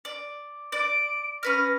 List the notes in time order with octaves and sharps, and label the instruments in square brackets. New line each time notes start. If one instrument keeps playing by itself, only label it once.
[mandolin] D5
[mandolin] D5 [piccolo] D7
[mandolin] C#4 B4 F6 [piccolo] A#6